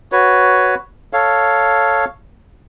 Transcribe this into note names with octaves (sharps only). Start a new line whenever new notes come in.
F#4 B4 C#5
A4 C#5 F5